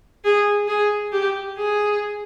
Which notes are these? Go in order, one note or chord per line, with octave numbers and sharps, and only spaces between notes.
G#4
G#4
G4
G#4